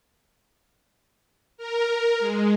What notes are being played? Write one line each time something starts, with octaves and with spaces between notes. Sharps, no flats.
A#4
G#3